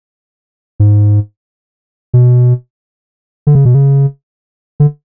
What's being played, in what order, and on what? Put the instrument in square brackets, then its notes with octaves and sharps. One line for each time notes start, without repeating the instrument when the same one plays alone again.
[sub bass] G#2
B2
D3
C#3
B2
C#3
D3